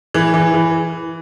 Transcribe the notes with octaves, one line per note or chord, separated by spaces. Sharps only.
E3
E3
E3